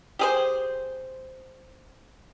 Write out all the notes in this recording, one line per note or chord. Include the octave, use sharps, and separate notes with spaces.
G4 G#4 C5